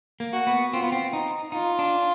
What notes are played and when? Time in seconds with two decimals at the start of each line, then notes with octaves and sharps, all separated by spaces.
0.20 A#3
0.33 F#4
0.47 B3
0.73 C4 F4
0.82 B3
0.92 C4
1.13 D#4
1.52 D#4 F4
1.79 D4